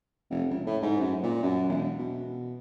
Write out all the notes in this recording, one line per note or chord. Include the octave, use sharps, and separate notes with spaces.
F1
C#2
A2
G#2
F#2
A#2
F#2
E1
B2